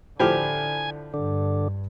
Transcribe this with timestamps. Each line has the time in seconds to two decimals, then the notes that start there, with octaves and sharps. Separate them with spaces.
0.20 A2 D3 F3 G4 G#5
1.14 G2 D3